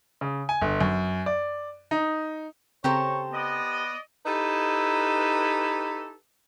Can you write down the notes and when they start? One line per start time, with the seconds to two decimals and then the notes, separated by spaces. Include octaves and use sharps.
0.21 C#3
0.49 G#5
0.61 G1
0.80 F#2
1.26 D5
1.91 D#4
2.84 C#3 C4 G4 A4 C5 C#5 A#5
3.33 B3 D5 D#5
4.26 D#4 E4 G4 A4 B4 D#5